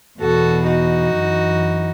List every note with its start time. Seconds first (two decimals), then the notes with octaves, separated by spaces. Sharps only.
0.20 E2 B2 F#4 A4
0.67 D#4 F#4
1.14 F#2 E3